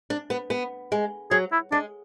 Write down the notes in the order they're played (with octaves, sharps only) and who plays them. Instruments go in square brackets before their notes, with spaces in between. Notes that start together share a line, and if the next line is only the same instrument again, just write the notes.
[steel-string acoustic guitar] D4
B3
B3
G#3
[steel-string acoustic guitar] F#3 [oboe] G#4
[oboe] E4
[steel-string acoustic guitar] G#3 [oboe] D4